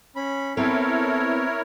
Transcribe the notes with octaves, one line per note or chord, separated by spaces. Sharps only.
C#4 B5
B3 C4 E4 A4 A#4 C#5